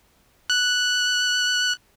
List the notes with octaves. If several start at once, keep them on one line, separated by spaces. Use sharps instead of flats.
F#6